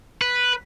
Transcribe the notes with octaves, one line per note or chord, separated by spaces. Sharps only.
B4